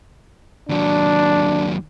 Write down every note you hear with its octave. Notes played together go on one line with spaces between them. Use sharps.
D#2 F#3 D4